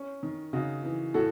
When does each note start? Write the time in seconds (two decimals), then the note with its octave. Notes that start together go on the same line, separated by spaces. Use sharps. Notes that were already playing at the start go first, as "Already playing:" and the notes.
Already playing: C#4
0.23 D#3
0.53 C#3 D#4 F#4
0.83 E3
1.14 A2 F#4 A4